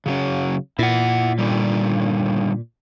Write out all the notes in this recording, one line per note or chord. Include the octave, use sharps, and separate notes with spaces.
C#3 F#3 C#4
A#2 E4 F#5
D3 D#3 G3